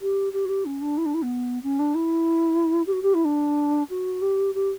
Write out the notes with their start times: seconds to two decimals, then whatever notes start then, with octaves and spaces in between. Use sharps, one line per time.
0.01 G4
0.33 G4
0.45 F#4
0.49 G4
0.65 C#4
0.81 D4
0.98 E4
1.06 D4
1.14 E4
1.22 B3
1.63 C#4
1.79 D4
1.95 E4
2.87 G4
2.92 F#4
3.03 G4
3.14 E4
3.25 D4
3.90 F#4
4.22 G4
4.55 G4